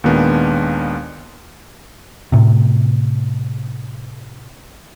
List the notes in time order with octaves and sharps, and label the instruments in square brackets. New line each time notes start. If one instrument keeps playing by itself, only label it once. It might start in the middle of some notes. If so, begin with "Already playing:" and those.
[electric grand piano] D#2 A#2 D#3 G#3 B3 D4
[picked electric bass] A2 C3